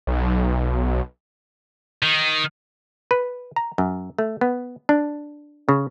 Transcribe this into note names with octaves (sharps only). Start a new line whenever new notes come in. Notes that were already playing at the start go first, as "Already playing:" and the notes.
B1
D#3
B4
A#5
F#2
A3
B3
D4
C#3